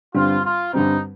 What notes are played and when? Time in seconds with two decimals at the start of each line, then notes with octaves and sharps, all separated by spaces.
0.14 G2 D3 G3 C4 F4
0.44 F4
0.73 G2 D3 G3 C4 D#4